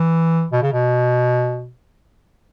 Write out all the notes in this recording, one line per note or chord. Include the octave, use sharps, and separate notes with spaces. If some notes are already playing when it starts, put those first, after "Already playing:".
Already playing: E3
B2
C#3
B2